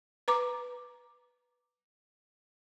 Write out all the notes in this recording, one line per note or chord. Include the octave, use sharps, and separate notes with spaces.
B4 A#5 D6